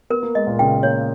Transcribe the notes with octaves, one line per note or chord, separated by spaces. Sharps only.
B3 A#4
A#3
G#3 D#5
A#2
C#3 G5
A#3 C#5